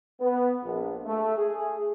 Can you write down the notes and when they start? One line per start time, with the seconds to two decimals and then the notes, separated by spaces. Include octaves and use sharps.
0.21 B3
0.63 A#1
1.06 A3
1.37 G#4